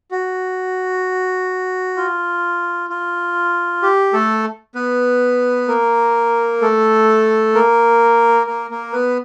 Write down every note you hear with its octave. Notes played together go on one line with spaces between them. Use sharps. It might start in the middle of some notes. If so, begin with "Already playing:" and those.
F#4
F4
F4
G4
A3 A4
B3 B4
A#3 A#4
A3 A4
A#3 A#4
A#3 A#4
A#3 A#4
B3 B4